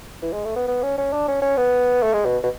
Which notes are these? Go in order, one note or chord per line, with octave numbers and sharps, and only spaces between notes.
E3
G#3
A3
B3
B3
C#4
C#4
D4
C#4
C#4
B3
A3
G#3
B2
B2